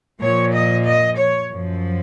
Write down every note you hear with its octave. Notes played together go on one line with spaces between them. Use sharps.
A#2 F3 C#5
D#5
D#5
C#5
F#2 F3